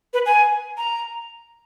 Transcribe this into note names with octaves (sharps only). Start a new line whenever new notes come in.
B4
G#5
A#5